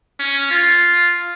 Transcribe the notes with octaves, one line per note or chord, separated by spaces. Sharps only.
C#4
F4